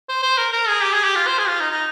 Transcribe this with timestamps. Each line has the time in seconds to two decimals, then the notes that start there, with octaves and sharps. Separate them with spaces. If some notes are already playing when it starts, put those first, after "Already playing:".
0.09 C5
0.23 C5
0.38 A#4
0.53 A#4
0.68 G#4
0.83 G4
0.93 G#4
1.04 G4
1.15 F4
1.27 C5
1.38 G#4
1.49 F4
1.60 D#4
1.71 D#4